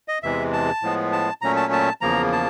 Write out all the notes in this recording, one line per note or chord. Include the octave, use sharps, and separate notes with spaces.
D#5
E2 C3 E3 G#3 E5
A5
A2 F3 G#3 B3
A5
A#2 F#3 A3 C#4 A#5
A5
A5
E2 C#3 F3 A#3 A#5
A5